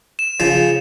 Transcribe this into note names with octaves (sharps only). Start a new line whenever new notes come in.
E7
C#3 F3